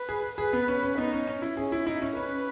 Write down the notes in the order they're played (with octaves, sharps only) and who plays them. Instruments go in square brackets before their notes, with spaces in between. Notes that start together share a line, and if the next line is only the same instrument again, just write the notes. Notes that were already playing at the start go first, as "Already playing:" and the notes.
Already playing: [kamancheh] B4
[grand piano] G#4
[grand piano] G#4 [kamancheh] B4
[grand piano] B3
C#4
C#4
[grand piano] B3 [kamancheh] D#4
[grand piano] C#4
C#4
E4
[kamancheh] C#4 [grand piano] G#4
[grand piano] E4
[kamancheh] D#4 [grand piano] E4
[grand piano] C#4
[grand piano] C#4 [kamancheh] B4